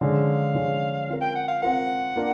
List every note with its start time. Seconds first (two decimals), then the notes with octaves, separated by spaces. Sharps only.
0.01 D3 F3 G#3 C#4 F5
0.55 D3 F3 G#3 C#4
1.09 C4 F4 A#4
1.22 G5
1.36 F#5
1.48 F5
1.63 C4 F4 A#4 F#5
2.16 A#3 D4 F4 A#4